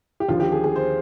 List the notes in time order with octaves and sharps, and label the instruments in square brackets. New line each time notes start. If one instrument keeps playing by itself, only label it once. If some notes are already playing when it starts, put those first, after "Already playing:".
[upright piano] G4
D#2 D3 F3 F4
G4
G#4
G#4
C5